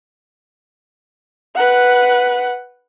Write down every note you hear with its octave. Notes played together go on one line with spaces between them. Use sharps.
B4 F#5